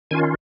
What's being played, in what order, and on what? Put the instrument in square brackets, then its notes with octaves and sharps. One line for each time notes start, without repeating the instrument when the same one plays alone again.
[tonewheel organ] D#3 C#4 F4 G#5